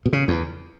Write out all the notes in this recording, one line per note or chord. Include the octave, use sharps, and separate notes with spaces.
B2
C#3
E2